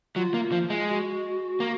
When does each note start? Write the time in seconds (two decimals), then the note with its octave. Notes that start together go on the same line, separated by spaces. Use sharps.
0.15 F#3 F4
0.34 A#3
0.52 F3
0.70 G#3
0.88 F#4
1.60 A#3